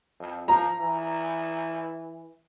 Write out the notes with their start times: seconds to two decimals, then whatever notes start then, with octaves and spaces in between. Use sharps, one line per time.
0.20 F2
0.48 F3 A#5
0.80 E3